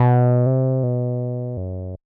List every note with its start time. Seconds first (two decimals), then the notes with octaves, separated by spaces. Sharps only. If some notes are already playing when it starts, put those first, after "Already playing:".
Already playing: B2
0.46 C3
0.83 B2
1.57 F#2